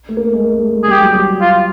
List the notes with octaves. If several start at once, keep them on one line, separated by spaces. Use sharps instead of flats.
A3
A#3
G#3
A3
G#3
G#3
G#4
G3 G4
F#3
G3
F4